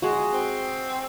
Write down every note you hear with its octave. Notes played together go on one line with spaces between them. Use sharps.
G#3 F#4
C4